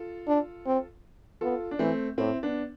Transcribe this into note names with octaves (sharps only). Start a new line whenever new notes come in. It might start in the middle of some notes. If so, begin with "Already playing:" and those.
Already playing: F4 A4
D4
C4
B3 F4 A4
D4
E3 A3 C4
A2 C4 E4
B3 D4